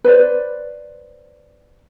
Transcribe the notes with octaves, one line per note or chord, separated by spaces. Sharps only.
B4 C5 D5